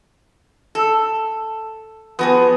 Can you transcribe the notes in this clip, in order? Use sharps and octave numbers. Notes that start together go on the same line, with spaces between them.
A4
F3 B3 F#4 G#4